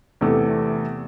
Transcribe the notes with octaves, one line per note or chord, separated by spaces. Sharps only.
E2 C3 A3